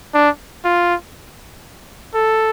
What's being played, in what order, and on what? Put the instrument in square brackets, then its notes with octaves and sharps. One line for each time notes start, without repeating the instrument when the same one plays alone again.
[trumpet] D4
F4
A4